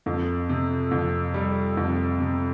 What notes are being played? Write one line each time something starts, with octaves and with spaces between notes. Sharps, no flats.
F2
C3
F2
G3
F2
C3